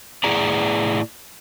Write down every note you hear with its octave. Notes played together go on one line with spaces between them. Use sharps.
A2 E4 G#4 D5 A#5